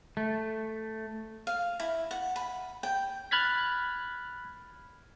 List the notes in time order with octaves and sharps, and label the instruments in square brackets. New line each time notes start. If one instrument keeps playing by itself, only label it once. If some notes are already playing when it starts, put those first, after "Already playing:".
[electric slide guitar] A3
[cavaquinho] F5
E4
F#5
B5
G5
[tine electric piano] B5 F6 F#6 G#6 A6 B6